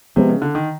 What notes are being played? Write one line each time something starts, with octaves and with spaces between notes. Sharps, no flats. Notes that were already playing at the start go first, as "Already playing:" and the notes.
C3 F3 G#3 B3
C#3
D3
D#3